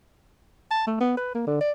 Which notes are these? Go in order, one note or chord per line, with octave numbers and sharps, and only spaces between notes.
A5
A3
B3
B4
A#3
D3
D5